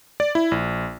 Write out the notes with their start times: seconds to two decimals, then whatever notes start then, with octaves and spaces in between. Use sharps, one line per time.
0.20 D5
0.35 E4
0.51 A#1